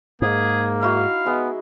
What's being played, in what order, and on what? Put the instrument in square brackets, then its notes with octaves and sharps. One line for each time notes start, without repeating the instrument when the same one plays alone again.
[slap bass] G#2 [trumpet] A#3 [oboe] G#4
[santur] D#4 E4 F#4 [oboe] F5
[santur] G#3 [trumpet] B3